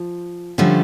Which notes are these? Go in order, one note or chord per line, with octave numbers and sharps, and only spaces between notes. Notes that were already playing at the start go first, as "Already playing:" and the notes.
Already playing: F3
D3 F3 G3 A3 C#4